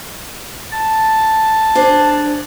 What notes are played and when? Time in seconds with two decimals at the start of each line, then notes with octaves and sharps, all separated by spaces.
0.72 A5
1.75 D4 G#4 C5